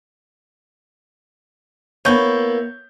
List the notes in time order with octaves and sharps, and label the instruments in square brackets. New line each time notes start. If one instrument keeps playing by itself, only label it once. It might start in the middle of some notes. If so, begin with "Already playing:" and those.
[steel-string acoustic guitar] A#3 B3 E4 [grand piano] C#5 G6